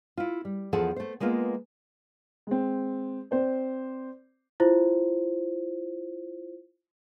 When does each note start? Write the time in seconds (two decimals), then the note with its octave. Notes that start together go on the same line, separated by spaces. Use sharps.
0.18 E4 F4
0.45 G3
0.73 E2 F3 G#4 A4 F#5
0.96 A3 C5
1.20 G#3 A#3 B3 F4
2.47 G#3 C4
3.31 C4 C5 D5
4.60 E4 F4 C5